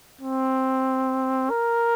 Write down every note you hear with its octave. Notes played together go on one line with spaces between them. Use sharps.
C4
A#4